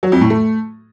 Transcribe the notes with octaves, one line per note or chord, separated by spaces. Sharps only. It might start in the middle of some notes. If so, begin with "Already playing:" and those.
F#3
F2
A2
A3